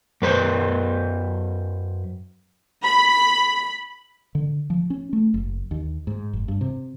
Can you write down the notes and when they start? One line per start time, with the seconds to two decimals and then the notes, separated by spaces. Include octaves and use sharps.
0.22 F#2 B4 C5
2.84 B5
4.35 D3
4.70 F3
4.90 C#4
5.13 A3
5.34 F#1
5.71 D#2
6.07 G#2
6.33 F#1
6.48 G2
6.61 C3